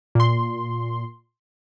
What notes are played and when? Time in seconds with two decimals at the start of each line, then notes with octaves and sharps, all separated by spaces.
0.15 A#2 C6